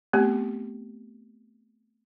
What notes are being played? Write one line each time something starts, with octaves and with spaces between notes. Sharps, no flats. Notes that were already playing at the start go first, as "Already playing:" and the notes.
A3 B3 C4 G4